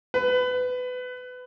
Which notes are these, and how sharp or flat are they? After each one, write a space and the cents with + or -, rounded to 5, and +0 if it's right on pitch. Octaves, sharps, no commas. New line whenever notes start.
B4 +25